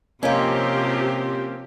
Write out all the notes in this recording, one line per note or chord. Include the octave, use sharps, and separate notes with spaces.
C3 F3 A#3 C4 C#4 G4 C#5 D#5